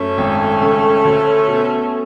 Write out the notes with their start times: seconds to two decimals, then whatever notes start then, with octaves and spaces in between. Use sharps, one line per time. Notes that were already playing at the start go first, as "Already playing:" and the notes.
Already playing: F#2 A3 C#4
0.18 G#1
0.62 C#3
1.05 D2
1.48 B2